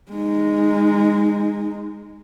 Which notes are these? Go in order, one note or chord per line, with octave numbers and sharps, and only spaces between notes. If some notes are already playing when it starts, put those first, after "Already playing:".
G#3 D#4